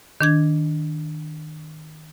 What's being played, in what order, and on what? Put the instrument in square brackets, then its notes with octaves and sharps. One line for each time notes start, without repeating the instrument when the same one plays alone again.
[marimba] D#3 D4 G#6